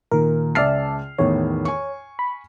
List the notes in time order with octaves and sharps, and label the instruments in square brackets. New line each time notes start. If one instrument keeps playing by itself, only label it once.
[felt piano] A#2 [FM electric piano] D#3 A#4
[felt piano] C#2 F6 C7 [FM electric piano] D5 E5 A5
[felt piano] E2 A2 D#3 [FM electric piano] C#5
[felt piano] G#5 C#6
[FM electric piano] B5